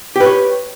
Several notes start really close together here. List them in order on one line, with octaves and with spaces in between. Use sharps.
G4 B4 C#5